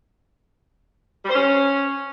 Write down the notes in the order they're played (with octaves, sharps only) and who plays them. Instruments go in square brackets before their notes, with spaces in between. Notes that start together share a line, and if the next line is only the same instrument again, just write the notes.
[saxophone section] G3
C5
C#4